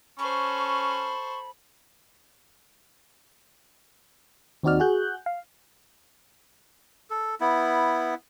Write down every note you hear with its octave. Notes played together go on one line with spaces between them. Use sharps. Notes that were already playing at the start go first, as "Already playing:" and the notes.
C#4 A4 C5 B5 C#6
D#2 C4 D#4 F#4 D5 F6
F#4 G#4 F#6 G6
F5
A4
B3 E4